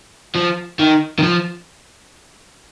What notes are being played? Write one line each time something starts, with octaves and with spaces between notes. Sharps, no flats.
F3
D#3
D#3
F3